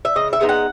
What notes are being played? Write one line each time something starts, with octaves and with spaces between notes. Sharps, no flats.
E5
C#3 D#5
E5
G#3 B3 D#4
F#5